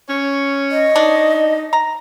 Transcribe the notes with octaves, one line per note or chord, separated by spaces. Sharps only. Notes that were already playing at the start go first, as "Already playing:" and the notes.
C#4 C#5
D#5
D4 D#4
A#5